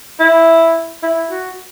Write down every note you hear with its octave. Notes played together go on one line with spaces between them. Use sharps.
E4
E4
F#4